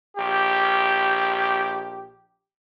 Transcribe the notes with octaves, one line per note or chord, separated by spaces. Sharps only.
A#1 G4